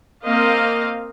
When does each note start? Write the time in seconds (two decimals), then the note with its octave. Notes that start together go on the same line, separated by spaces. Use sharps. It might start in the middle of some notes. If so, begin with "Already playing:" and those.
0.24 A#3 C4 D#5 F5